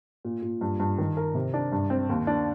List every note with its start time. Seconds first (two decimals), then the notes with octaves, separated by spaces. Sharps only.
0.25 A#2
0.42 A#2
0.61 G2
0.80 G2
0.98 D#3
1.17 A#4
1.35 C3
1.54 D4
1.72 G2
1.90 C4
2.09 D#2
2.27 D4